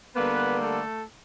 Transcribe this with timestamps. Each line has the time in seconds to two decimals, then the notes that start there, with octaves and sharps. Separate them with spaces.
0.15 D3 G3 A#3 B3 B4
0.61 A3 A4